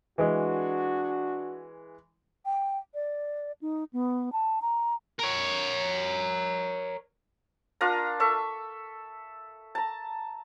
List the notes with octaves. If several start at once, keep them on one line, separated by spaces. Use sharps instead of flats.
E3 G#3 D4 F#4
G5
D5
D#4
B3
A5
A#5
A#4 C#5
D4 F4 A#4 A#5
A4 E5 C#6
A5 A#5